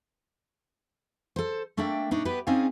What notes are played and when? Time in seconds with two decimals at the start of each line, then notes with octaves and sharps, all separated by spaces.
1.36 A4 C5
1.77 A3 A#3 D4 A4 E5 G5
2.11 A#2 D4 D#4 C#5
2.25 B3 G4 B4
2.47 C4 C#4 D#4 G#4 D5 F5